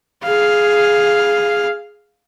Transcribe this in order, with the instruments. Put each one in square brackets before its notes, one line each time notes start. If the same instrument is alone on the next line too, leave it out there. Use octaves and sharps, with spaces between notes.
[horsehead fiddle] G#4 F5